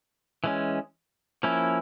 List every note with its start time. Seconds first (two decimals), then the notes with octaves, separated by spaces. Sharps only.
0.44 E3 G#3 C#4
1.43 F3 A#3 C#4 E4